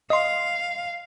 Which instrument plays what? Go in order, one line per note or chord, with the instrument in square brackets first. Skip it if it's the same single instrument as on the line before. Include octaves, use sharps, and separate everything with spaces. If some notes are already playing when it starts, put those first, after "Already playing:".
[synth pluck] D#5 C6 [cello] F5